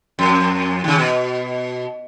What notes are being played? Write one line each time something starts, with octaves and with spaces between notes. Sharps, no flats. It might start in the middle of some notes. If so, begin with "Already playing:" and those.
F2
D#2 C#3
B2